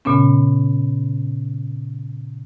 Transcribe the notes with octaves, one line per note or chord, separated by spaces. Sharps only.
A#2 C#3 B3 C#4